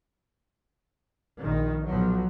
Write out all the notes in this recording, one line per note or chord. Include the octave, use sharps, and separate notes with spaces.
A#1 D#3
B1 F3 F#3